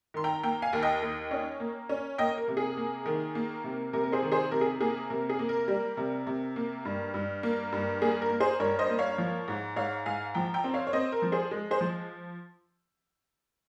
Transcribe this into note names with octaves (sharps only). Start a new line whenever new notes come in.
D#3 C6
G5 A#5
A#3 G5 A#5
F5 G#5
D#2
D#5 G5
D#2
C#4
A#3
C#4
A#3 D#5 G5
A#4
C3
G#4
A#3
D#3
A#3
C3
C3 A#4
A#4
G#4 C5
D#3
G#4 C5
C3 A#4
G#4
A#3 G#4
C3 A#4
G#4
A#3
A#4
G3
C3
C3
A#3
G2
G2
A#3
G2
A#3 G#4
A#4
A#3
G#4 C5
G2 A#4 C#5
C5 D#5
A#3
C#5 F5
F3
G#2
G#2 C#5 F5
G#2 F5 G#5
F3 G5 A#5
G5 A#5
C4
C#5 F5
C#5
C4 C5 D#5
A#4
F3
G#4 C5
G#3
G#4 C5
F3